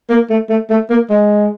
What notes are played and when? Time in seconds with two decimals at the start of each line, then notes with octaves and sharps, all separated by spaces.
0.10 A#3
0.30 A3
0.49 A3
0.70 A3
0.90 A#3
1.10 G#3